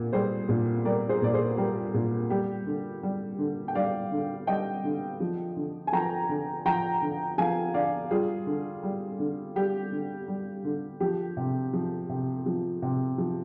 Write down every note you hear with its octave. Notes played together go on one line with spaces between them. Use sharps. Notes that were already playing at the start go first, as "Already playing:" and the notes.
Already playing: A#2
G3 G#4 C5
A#2
G3 A#4 D5
G#4 C5
A#2 D5
G#4 C5
G3 G4 A#4
A#2
G3 G4
D3
G3
D3
G5
G3 D5 F5
D3
G3 D#5 G5
D3
F3
D3
G#5
F3 G5 A#5
D3
F3 G5 A#5
D3
F3 F5 G#5
D3 D5 F5
G3 F4 G#4
D3
G3
D3
G3 G4
D3
G3
D3
F3 G4
C3
F3
C3
F3
C3
F3